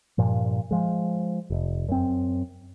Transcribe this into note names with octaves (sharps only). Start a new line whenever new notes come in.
G2 A#2 F3
F3 G#3
F1
F#2 C4